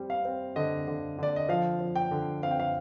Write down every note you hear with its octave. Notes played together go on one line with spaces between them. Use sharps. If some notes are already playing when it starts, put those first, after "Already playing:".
Already playing: G3 C4
F5
C4
D3 D#5
D3
D3 D5
D#5
F3 F5
F3
G5
D3
C4 F5
G5
F5